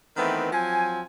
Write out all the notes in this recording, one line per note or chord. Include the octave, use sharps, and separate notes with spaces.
D#3 E3 A3 B3 C4 B4
F3 F#3 C4 G#5